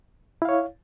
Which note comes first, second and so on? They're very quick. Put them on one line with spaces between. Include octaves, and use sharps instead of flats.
E4 F5 C#5